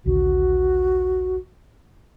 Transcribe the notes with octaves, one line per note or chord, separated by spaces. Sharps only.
A#1 D#2 D3 F#4